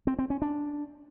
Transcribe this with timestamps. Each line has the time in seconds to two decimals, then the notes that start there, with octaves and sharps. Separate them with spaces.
0.07 C4
0.19 C4
0.30 C#4
0.42 D4